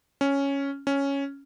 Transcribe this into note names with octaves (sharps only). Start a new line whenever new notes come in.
C#4
C#4